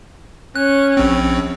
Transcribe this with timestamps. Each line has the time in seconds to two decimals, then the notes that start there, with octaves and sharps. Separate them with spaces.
0.56 C#4 F#6
0.97 A#1 C4